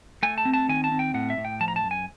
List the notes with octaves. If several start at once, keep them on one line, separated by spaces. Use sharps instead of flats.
A3 G#5
A5
C4
A5
D#3 G#5
A5
C4
G5
A2 F#5
E5
A2
G5
F3 A5
A#5
A5
F#2
G#5